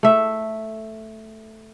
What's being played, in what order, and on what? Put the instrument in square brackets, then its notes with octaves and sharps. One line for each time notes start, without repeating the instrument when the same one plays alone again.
[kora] A3 E5